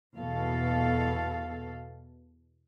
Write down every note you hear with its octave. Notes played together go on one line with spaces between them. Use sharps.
E2 B2 A4 F5